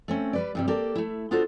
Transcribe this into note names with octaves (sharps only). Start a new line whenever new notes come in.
A3 C4 C#4
G3 B4 D5
G2 C3 G3
A#3 G4 A4 D5
A3 E4
B3 D4 F4 F#4 A4 C5